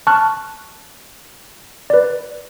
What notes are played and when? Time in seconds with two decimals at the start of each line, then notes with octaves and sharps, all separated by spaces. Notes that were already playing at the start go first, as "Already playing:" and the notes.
0.07 A5 C#6 F6 F#6
1.90 B4 D5